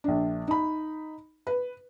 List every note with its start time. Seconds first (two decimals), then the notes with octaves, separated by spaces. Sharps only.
0.04 A#1 D4
0.48 D#4 B5
1.47 B4